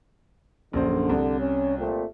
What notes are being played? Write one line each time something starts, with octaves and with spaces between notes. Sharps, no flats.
A#1 F#2 D3 C5
C2
C#4
A#2 A3 C4